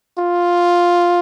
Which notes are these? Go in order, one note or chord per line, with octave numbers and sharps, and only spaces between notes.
F4